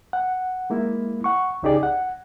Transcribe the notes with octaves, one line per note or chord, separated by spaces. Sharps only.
F#5
G#3 A#3 E4
F#5 C#6
C2 C#3 D#4 G4 G#4 D5
F#5